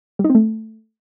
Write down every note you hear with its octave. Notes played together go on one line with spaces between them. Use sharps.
G3
D#4
C4
A3